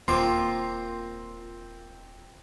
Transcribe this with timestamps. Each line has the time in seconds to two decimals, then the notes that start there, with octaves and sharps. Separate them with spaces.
0.08 D#1 A#3 C4 F4 C5 A#5 C6 D6